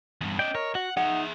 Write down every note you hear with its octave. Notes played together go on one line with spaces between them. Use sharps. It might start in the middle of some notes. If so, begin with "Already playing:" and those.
E2 G2
C#4 D5 D#5 G5
A#4 C#5
F#4 F#5
D#4 G#4 E5 F#5